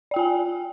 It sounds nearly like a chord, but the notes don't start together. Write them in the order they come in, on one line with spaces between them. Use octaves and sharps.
D5 G5 F4 G#5